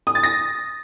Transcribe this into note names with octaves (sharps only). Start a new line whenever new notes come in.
D#6
A6
A#6